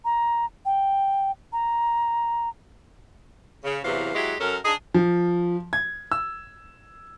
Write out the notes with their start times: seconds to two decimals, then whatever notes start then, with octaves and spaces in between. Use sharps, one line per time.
0.05 A#5
0.65 G5
1.53 A#5
3.64 C#3
3.84 E2 C3 E3 F#3 F5
4.15 F#3 G#3 E4 F#4 G4
4.40 F#2 C#4 A4 A#4
4.65 D4 D#4 G#4
4.94 F3
5.73 G#6
6.12 E6